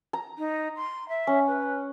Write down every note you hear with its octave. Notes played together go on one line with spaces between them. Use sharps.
A#5
D#4
C6
E5
C#4
B4